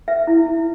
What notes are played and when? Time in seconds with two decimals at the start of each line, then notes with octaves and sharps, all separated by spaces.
0.08 B4 E5
0.27 E4
0.46 E4